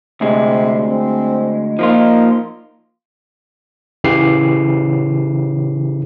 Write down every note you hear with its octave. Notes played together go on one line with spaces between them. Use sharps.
D2 C3 G#3
C4
F3 A#3 D#4 F4
C#3 E3 G4 C7